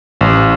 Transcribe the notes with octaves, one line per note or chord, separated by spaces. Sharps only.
A1